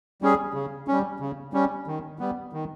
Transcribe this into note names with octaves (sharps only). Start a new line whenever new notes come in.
G3 C#4 G#4
C#3
G3 C#4
C#3
G3 C#4
D#3
G3 B3
D#3